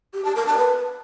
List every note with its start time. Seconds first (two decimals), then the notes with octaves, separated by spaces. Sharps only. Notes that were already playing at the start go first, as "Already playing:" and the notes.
0.14 G4
0.25 A5
0.36 A#4
0.47 A5
0.58 B4